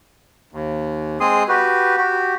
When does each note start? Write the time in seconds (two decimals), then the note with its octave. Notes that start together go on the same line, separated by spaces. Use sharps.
0.52 D#2
1.20 G#3 C4 G#4 C6 D#6
1.48 F#4 G4 B4
1.97 F#4 G4